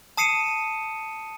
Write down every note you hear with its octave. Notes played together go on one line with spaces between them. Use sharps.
A5 D#6 C7 C#7 D#7 E7